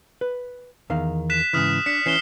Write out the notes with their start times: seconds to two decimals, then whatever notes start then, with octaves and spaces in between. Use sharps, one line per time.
0.21 B4
0.90 E2 D#3 F5
1.30 F#6 B6 E7
1.53 G#2 C#3 E3 D#6 F6 B6
1.86 D4 B6 C#7
2.06 E3 C#4 C7 E7 G7